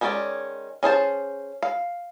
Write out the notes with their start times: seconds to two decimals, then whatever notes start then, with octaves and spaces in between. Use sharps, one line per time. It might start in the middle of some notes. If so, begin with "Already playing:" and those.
0.01 D#3 G#3 C#4 F#4 D5
0.83 C#4 G#4 C5 A5
1.62 F5